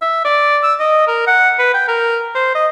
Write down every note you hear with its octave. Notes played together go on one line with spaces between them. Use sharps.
E5
D5
E6
D#5
A#4
F#5
B4
G5
A#4
C5
D#5